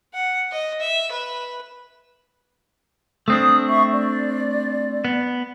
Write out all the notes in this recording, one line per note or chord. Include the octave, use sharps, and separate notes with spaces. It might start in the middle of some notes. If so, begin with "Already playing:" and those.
F#5
D#5
E5
B4
A3 C4 D4 D#6
E5 C#6
D5
B3